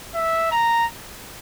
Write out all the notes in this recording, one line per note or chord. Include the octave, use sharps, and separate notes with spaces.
E5
A#5